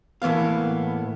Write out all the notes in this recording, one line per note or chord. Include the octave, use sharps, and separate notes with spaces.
A2 E3 A#3 B3 F5